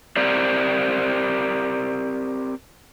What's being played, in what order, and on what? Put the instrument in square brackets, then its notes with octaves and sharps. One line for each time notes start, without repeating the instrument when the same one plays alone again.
[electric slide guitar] C4 G4 A#4 C5 D5